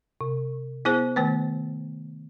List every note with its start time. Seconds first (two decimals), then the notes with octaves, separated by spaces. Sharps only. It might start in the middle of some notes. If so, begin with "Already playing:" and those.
0.21 C3
0.85 B3 E4 G#4 C5
1.16 D#3 A3 B3 B4